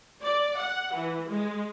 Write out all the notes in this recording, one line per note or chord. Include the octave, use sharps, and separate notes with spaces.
D5
F#5
E3
G#3